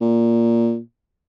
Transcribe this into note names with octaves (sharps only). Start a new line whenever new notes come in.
A#2